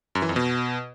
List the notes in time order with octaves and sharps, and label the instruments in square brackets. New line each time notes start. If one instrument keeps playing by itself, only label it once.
[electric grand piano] F#2
E3
F2
B2